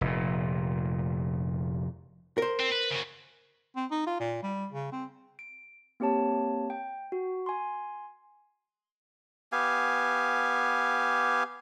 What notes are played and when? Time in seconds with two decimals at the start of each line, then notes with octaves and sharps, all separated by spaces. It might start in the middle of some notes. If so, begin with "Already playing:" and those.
0.01 F1 A#2
2.38 A#4 C5
2.59 C4
2.72 B4
2.91 C#3 F#4
3.76 C4
3.91 D#4
4.07 F4
4.20 A#2
4.43 G3
4.72 C#3
4.92 C4
5.39 D7
6.00 A#3 C4 G4 C#5 A5
6.70 G5
7.12 F#4
7.46 G#5 C6
9.52 B3 G4 F5 G#5